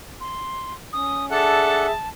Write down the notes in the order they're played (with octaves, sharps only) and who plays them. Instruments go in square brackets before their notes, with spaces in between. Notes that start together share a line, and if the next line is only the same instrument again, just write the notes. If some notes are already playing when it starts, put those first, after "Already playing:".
[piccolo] C6
[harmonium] C#4 [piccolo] D#6
[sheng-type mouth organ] D4 A4 F#5 [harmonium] G#4 E5 [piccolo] A5